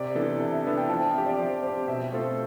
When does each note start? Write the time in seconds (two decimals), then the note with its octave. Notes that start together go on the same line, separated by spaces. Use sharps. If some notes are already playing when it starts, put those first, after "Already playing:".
Already playing: C3 D5
0.15 E3 B3 D4 A4
0.40 C3 E5
0.52 E5
0.64 E3 B3 D4 A4 D5
0.78 G5
0.89 F3 A5
1.01 G5
1.13 C4 G4 E5
1.26 D5
1.38 F3 C5
1.62 C4 G4 C5
1.88 B2 E5
2.12 A3 C4 F4 A4 C5